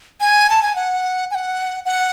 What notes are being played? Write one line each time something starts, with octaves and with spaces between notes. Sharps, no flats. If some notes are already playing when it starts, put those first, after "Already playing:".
G#5
A5
G#5
F#5
G#5
F#5
F#5